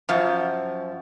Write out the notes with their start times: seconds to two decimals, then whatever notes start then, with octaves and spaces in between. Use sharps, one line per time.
0.09 F#2 F3